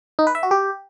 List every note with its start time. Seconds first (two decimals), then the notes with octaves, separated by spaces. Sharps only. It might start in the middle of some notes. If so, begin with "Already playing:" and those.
0.19 D#4
0.27 B4
0.35 E5
0.43 F#4
0.51 G4